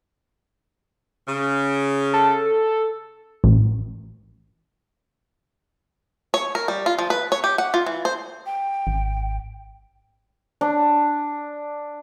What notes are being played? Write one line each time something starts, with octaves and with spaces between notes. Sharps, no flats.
C#3
A4
A1
C#5
A#4
G3
F4
F3
B4
C#5
G4
F#5
F4
E3
C5
G5
G#1
D4